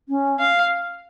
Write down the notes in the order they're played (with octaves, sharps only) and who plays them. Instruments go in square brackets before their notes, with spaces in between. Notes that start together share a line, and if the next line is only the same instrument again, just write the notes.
[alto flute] C#4
[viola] F5